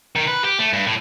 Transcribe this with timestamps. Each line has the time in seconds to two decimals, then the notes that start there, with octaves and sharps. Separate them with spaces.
0.16 D#3
0.27 B4
0.44 G4
0.59 A3
0.73 G2
0.86 A2